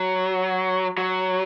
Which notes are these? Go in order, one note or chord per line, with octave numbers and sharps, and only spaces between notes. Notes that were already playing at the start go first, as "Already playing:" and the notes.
Already playing: F#3
F#3